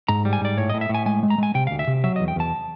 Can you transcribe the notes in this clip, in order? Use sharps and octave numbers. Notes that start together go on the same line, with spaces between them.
G#2 A#5
G3
G#5
G#2 D5
A2 C#5
A2 D#5
E5
A2
G#5
G#3 G#5
G#3
A#5
G#3 G#5
C3 G5
D2 F5
E5
C3
F#3 E5
E2 D#5
G5
E2 A5